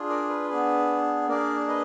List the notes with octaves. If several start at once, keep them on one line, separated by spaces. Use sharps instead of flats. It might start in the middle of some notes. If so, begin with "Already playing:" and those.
Already playing: D4 F4 G#4
A#4 D5
B4
B3 D4 G#4
A#3 D4 G#4 A#4 D5
B4 D#5